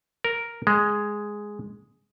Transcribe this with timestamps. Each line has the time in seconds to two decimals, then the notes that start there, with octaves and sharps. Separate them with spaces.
0.24 A#4
0.67 G#3